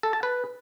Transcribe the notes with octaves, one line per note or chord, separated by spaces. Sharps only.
A4
A5
B4